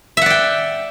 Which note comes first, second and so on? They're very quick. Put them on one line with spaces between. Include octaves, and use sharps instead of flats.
E5 F#5 D5 G5